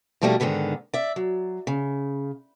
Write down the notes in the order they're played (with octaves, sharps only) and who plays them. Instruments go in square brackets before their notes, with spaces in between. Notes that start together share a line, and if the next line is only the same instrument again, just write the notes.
[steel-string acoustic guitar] B2 F3 G3 A3 A#3 D#4
G#2 B2 D3 D#3 B3
D5 E5
F#3
C#3